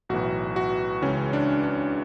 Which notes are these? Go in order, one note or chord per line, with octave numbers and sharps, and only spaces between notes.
B1 A2 E3 F#4
F#4
C#2 C#3 E3 C#4
D4
D4